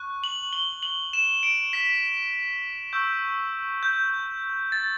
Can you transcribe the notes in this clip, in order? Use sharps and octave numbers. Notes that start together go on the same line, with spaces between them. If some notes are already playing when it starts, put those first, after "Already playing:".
Already playing: C#6 F#6
F#7
G7
F#7
E7
D7
B6
C#6 E6 G6
G6
A6